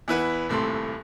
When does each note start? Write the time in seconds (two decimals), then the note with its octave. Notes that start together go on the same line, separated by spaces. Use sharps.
0.08 E2 E4 B4 F#5
0.49 D#1 A2 C3 A4 C6